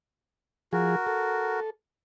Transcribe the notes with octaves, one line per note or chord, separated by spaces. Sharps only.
F3 F#4 G#4 A#4
A4